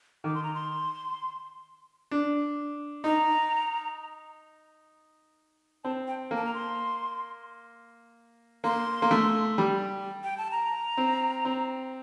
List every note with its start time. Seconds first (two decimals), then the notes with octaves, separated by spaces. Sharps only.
0.24 D#3 D6
0.34 C6
0.43 A#5
0.54 C6
2.11 D4
3.04 D#4 A#5
5.84 C4 A5
6.07 G5
6.31 A#3
6.37 A5
6.45 A#5
6.54 C6
8.64 A#3 C6
9.02 A#3
9.11 A3
9.58 G3
10.24 G5
10.38 A5
10.51 A#5
10.97 C4
11.45 C4